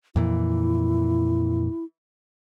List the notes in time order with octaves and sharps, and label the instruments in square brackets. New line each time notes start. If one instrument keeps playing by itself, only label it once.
[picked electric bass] F2 A#2 E3 [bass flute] E4